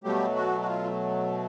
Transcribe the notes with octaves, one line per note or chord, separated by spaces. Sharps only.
B2 F#3 G3 A3 G4
F#4
F#4
F4